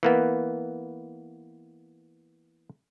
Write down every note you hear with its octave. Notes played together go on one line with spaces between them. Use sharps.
E3 A#3 B3